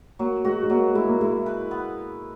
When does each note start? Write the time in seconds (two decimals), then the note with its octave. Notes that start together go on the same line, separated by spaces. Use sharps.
0.19 F#3 A#3
0.44 G#3 F#4
0.63 G#3
0.70 F#3 A#3
0.95 G#3 E4
1.08 A#3
1.21 G#3 E4
1.46 B4
1.71 B3